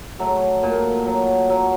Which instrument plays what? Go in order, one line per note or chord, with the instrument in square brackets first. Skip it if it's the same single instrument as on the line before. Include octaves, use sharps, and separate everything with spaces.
[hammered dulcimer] F#3 A3
A#2
F#3
F#3